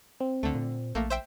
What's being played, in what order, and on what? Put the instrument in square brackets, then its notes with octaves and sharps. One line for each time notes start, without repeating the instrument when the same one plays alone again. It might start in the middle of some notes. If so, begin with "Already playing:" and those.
[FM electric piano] C4
[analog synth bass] D2 [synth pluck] D3 A3
[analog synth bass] A#2
[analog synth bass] A#1 [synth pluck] A3 A#3
[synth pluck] C5 E5 G5